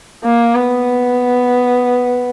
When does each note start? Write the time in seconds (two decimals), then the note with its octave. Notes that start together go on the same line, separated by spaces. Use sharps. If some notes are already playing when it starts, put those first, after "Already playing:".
0.24 A#3
0.55 B3